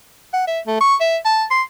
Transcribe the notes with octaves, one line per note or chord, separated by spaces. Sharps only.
F#5
E5
A3
C#6
E5
A5
C6